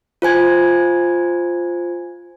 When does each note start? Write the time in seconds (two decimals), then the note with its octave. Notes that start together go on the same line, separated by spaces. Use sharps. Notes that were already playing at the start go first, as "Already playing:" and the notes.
0.22 F4 C5 G#5 G#6